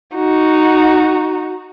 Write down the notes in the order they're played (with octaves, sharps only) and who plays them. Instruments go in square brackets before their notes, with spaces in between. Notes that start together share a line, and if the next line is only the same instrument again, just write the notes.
[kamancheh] D#4 F#4